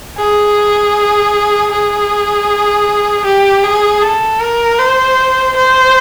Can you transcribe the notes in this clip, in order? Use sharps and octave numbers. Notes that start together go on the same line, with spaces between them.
G#4
G#4
G4
G#4
A4
A#4
C5
C5